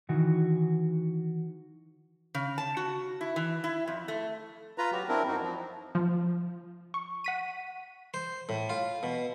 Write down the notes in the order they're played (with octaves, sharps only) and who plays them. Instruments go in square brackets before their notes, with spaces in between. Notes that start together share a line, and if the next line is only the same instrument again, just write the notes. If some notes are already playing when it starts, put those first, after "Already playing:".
[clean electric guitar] D#3 E3 F#4
[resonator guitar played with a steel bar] C#3
A5
F#4
E4
E3
E4
F2
A3
[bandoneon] F4 B4 A#5
F#3 F#4 G4
C4 D4 E4 A#4
F#2 D#4 F#4
F3
[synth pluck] F3
C#6
F#5 B6 D#7
[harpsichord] C5
A2
F4
B2